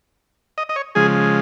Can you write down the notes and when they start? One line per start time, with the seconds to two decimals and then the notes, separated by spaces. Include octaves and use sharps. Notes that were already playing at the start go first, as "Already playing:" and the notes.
0.58 D#5
0.69 D#5
0.76 C#5
0.95 C#3 F3 G#3 G#4